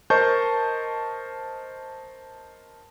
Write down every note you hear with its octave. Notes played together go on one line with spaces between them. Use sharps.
A#4 C5 D#5 A5 C#6 G6